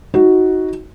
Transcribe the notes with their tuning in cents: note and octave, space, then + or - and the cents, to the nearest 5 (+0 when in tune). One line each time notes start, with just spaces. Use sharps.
D#4 +25 F#4 +0